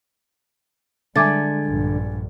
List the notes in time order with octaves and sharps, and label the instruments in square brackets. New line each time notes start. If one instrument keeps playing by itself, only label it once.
[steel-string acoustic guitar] D3 [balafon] G3 E5 D6 [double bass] G#3 [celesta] G#5 G#6 A6
[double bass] A#1 G2